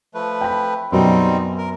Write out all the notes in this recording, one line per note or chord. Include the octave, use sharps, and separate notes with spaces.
F3 A3 B4
G5 B5
F#2 B2 F#3 G3 C4 D#4
A#4